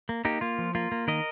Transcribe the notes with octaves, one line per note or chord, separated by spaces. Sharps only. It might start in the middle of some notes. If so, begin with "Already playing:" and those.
A#3
A#3 D#4 G4
A#3 F4
F3
A#3 F4
A#3
D#3 A#4 D#5